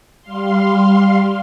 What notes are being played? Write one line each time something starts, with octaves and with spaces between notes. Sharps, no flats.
G3 F5 C6